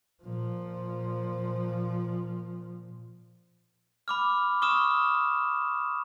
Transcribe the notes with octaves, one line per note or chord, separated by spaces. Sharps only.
A#2 F3
B5 D6 F6
C#6 D#6 F6 E7